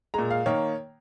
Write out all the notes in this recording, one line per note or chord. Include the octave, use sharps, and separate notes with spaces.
A#2 G#3 A#5
F5
D#3 A#3 C#5